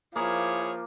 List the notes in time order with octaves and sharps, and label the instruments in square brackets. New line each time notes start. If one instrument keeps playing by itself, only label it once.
[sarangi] F3 [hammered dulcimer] A#3 [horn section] E4 G#4 C#5